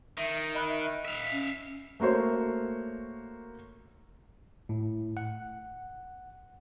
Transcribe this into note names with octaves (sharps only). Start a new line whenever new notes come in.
D#3 E5
D#5 B5 F#6
E5 F5
C#4
A3 A#3 F#4 C5 C#5
A2
F#5